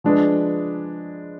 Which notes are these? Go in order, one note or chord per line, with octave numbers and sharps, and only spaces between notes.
F3 G#3 D4 G#4 B4